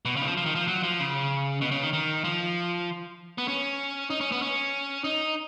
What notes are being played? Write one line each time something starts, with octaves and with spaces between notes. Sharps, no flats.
B2
C#3
D#3
F3
F3
D#3
F3
F#3
F3
C#3
B2
C#3
D#3
D#3
F3
B3
C#4
D#4
C#4
B3
C#4
D#4